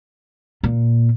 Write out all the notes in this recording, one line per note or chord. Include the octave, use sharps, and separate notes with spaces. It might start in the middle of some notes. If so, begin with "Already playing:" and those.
A#2